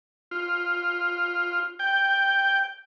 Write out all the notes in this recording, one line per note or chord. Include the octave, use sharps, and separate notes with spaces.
F4
G5